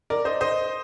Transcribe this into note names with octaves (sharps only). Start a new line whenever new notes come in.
A#4 D5
C5 D#5
C5 D#5